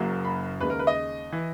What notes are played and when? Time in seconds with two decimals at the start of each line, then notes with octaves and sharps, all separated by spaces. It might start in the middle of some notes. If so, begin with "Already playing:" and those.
Already playing: F#1 F#2 C#3 F#3 A#3
0.25 B5
0.61 D#2 C#3 G#3 B4
0.70 A#4
0.79 B4
0.87 D#5
1.32 E3